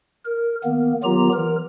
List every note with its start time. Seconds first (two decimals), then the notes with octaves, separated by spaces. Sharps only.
0.25 A#4
0.64 D#3 A#3 B3
1.04 D#3 F#3 B3 F4 G4 A#5
1.33 E3 A#4